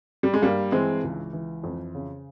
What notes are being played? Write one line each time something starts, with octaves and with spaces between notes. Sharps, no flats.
G3
G#3
G2 G3 A#3
E3 G#3 C4
C#2
E3
F2
C#3